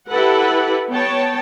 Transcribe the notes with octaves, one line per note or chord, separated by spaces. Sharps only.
E4 G4 A4 B4 F#5
B3 C#5 G5 A5